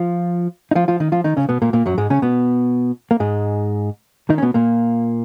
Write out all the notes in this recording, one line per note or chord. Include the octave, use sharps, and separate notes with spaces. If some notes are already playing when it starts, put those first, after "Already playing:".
Already playing: F3 F4
D#4
F3 F4
F3 F4
D#3 D#4
F3 F4
D#3 D#4
C#3 C#4
B2 B3
A#2 A#3
A#2 A#3
F#2 F#3
G#2 G#3
C#3 C#4
B2 B3
A#3
G#2 G#3
D#3 D#4
C#4
B2 B3
A#2 A#3